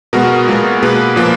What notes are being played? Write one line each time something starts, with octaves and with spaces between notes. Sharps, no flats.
B2 G#3 B3 F#4 A#4
A#2 G#3 B3
B2 A#3 G#4 B4
A#2 F3 A#3